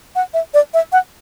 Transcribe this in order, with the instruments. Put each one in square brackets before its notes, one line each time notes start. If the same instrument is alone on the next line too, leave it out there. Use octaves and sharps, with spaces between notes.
[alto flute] F#5
E5
D5
E5
F#5